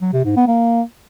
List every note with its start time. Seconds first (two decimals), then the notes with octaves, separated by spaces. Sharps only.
0.01 F#3
0.13 C3
0.25 G#2
0.36 B3
0.48 A#3